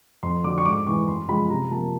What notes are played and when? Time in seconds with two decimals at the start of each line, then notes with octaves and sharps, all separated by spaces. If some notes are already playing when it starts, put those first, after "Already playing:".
0.23 F2 C6
0.44 D3 F#3 D6
0.58 C#6
0.65 G#2 D6
0.86 E3 G#3 C#6
1.08 F#2 C6
1.29 C#3 F3 G#3 B5
1.50 C3 A#5
1.71 F3 A#3 A5